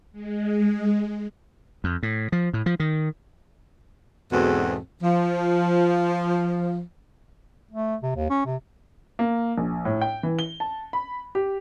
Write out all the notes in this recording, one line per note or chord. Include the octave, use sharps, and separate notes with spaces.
G#3
F2
A2
F3
A2
F3
D#3
E2 G#2 B2 C4 F#4 A4
F3
A3
C3
D#2
C#4
C3
A#3
A#1
A2
G5
E3
G7
A5
B5
G4